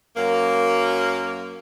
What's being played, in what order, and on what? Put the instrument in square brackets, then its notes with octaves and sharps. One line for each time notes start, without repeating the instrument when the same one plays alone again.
[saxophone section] F#2 F#3 A#3